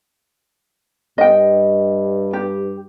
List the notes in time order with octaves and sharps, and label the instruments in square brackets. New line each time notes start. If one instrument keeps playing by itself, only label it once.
[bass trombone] G2 [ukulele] D#5 G5
[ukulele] G4